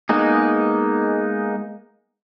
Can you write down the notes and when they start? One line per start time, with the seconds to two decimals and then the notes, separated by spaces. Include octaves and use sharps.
0.09 G#3 A#3 B3 D#4 G#4